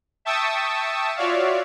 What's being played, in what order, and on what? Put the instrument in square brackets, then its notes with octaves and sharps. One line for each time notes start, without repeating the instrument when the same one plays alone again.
[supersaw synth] E5 G5 A5 C#6 D#6 E6
F4 F#4 C#5 D5 E5 F5